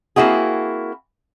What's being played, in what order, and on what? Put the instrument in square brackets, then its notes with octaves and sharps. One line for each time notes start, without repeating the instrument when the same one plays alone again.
[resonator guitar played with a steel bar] A#3 C4 E4 F#4 G#4